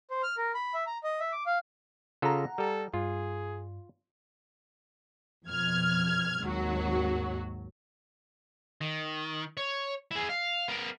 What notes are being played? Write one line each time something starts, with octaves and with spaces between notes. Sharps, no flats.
C5
F6
A#4
B5
E5
A#5
D#5
E5
D6
F5
C#3 F4 A4 F#5 A#5
G3 A4
G2 F4 G#4
F2 B2 F6 G#6
G#1 D#2 F#3 F#4
D#3
C#5
E4 G#4
F5
B3 A#4